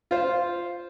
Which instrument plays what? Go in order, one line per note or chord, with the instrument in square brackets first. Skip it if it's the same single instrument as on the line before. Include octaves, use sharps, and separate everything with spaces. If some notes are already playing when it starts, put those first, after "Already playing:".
[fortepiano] F4 C5